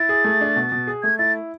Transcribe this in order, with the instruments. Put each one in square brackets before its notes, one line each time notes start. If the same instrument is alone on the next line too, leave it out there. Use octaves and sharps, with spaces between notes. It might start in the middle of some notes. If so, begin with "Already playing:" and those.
Already playing: [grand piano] E4 [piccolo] A6
[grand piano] G#4
A3
D4
B2
B2
G#4
[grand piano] A3 [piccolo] G#6
[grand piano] E4 [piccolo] A6